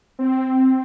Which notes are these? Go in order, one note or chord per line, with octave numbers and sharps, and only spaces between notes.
C4